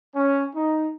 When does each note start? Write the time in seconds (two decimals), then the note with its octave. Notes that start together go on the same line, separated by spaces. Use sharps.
0.15 C#4
0.55 D#4